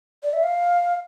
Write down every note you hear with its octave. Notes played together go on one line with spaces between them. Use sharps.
D5
E5
F5